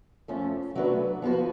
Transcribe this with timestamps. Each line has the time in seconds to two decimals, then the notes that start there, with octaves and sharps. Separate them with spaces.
0.28 F2 F3 A3 C#4
0.75 F#3 A3 D4 F#4 B4
1.22 F3 B3 F#4 B4